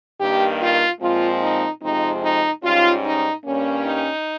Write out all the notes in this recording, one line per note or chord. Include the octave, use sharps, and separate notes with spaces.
G2 D#3 A#3 G4
F4
A#2 F3 G#3 C4 F4
D#4
F2 C3 F3 G#3 C4 D#4
D#4
G#2 G3 C#4 F4
D#4
G2 G3 A#3 C#4
D#4